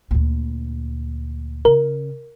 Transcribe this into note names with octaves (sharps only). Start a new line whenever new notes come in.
D2 A#2
C#3 A#4